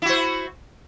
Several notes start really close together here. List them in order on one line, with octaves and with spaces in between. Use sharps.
E4 F#4 C5